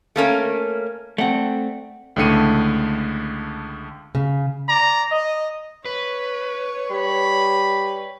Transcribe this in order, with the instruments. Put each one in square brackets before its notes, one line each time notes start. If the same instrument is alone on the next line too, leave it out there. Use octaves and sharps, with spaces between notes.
[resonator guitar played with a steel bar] A3 A#3 C#4 A#4
[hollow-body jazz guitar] A3 C4 [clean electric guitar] D5 F#5
[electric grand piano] C#2 A2 D3 A3 C#7 D#7
[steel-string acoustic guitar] C#3
[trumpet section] D5 A#5
D#5
[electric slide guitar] B4 [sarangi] C#5
[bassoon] G3 [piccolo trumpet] B5